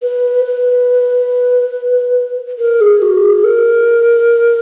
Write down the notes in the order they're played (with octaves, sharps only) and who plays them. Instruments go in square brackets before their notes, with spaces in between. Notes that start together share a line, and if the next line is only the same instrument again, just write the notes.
[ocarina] B4
B4
A#4
G#4
F#4
G#4
A#4